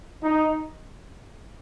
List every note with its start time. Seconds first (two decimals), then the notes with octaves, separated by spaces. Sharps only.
0.22 D#4